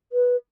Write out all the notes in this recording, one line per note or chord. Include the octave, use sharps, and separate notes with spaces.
B4